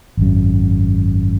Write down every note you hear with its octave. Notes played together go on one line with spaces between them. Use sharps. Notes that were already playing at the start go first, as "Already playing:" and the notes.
G#1 F#2